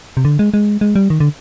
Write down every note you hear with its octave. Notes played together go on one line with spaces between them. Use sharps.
C3
D3
G#3
G#3
G#3
G3
D#3
D3